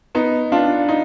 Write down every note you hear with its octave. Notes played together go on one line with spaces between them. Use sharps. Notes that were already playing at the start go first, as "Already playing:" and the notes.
B3 D#4
D4 F4
D#4